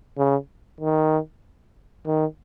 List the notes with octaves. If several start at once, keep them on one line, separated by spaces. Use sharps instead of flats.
C#3
D#3
D#3